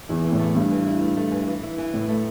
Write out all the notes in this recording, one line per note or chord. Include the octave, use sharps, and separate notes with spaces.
E2 E3 E4
E3
A2
A3
G2 E4
E3
E4
A3
A3
E3
E3
E4
E3
A2 E4
A3